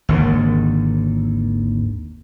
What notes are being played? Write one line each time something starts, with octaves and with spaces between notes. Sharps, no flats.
G#1 D#2 D3